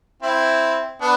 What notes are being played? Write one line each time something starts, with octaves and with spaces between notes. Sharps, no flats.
C4 E4
B3 D4